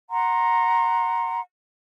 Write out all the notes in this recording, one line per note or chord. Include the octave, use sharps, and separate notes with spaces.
F#5 A#5 C6